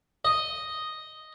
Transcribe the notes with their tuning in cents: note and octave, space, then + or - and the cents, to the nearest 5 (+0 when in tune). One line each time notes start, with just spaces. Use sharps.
D#5 +0